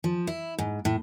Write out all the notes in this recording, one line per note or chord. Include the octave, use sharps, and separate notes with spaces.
F3
E4
G#2
A2